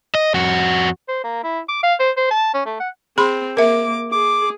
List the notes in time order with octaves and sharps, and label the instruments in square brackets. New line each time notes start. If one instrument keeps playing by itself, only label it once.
[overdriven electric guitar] D#5
F2 F#4
[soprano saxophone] C5
A#3
E4
D6
F5
C5
C5
A5
C#4
A3
F#5
[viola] C4 [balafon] G#4 B5 C6
[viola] A#3 D6 [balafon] A#4 E5
[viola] G#4 [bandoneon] D6